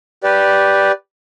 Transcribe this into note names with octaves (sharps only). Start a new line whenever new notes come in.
G4 B4 D5